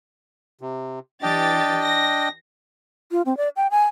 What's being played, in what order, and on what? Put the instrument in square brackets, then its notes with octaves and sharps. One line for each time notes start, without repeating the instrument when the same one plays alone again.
[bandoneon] C3
[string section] E3 G4 A6 [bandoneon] D4 D#5 G5
[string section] A#6
[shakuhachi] F4
C4
D5
G5
G#5